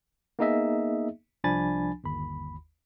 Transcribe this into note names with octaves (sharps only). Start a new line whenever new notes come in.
A#3 B3 D#4 G#4 D#5 E5
C2 F3 D4 G#5 B5 A6
G1 D#2 B5